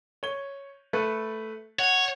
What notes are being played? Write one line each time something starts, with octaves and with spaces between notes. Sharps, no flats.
C#5 G7
A3 A4 B4
C#5 F#5